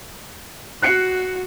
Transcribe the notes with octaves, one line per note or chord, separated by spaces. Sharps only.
F#4 F#6 C7 C#7